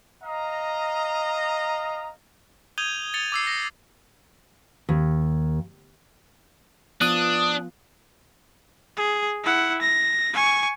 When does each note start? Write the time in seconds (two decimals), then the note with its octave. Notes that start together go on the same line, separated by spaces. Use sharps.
0.23 D#5 F5 A#5
2.78 D#6 G6 G#6 D#7 F7 G7
3.14 A6 C#7 F7 G7
3.32 D6 E6 C7
3.47 A#6
4.89 D#2
7.01 F3 B3 D4 F4 D#6 F#6
8.97 G#4
9.44 E4 F#5
9.82 A#6
10.34 G#5 C#6